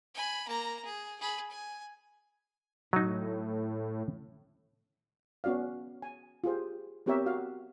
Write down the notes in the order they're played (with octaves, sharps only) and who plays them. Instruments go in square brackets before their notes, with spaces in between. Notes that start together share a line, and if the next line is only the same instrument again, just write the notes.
[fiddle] G#5 B5
A#3 A#5
G#4
G#4 B5
G#5
[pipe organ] A2 [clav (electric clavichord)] F#3 D#4
[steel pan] B3 C#4 F#4 D5 F5
G#5
F4 G4 G#4 C5
B3 C4 G4 A#4 C#5 E5
F#4 F5